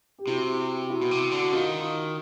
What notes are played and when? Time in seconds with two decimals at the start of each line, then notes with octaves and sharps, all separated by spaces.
0.18 G4
0.27 C3 E4 F#4
0.90 E4 F#4
1.02 B2
1.11 C3
1.31 D3
1.42 F#4
1.52 D#3 D#4 F4